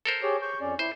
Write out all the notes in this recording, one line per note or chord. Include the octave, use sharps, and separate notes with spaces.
A4 A#4 C5
G4 G#4 C#5
C#6 G6
F2 C#4 D5
E4 C5